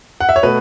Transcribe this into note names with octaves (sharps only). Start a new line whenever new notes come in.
F#5
E5
C#5
B2 A3 B4